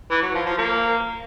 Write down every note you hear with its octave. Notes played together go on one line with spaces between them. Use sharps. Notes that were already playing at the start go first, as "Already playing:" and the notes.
E3
F#3
F3
F3
A#3